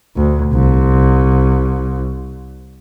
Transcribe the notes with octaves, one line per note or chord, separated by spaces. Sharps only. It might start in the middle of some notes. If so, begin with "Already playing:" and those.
D2
C2